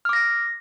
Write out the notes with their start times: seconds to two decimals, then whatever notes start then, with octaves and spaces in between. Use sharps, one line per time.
0.05 F6
0.09 D6
0.13 A#6